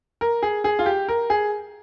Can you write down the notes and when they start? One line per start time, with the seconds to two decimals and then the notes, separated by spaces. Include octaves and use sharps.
0.21 A#4
0.43 G#4
0.64 G#4
0.79 F4
0.86 G4
1.08 A#4
1.30 G#4